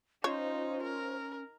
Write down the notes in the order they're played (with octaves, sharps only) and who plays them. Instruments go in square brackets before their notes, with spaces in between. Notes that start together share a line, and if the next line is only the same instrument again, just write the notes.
[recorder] C#4 [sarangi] D#4 [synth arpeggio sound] F4 C5 [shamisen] C#5
[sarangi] A#4